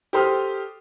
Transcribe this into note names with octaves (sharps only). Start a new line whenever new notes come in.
G4 A4 C5 C6 D#6 F6